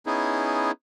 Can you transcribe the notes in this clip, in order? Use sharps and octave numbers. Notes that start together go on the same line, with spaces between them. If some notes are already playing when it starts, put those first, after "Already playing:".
B3 C#4 D#4 E4 G#4